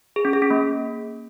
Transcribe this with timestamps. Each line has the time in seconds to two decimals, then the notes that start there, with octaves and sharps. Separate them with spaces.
0.16 G#4
0.25 C#4
0.33 G#4
0.42 C#4
0.50 A#3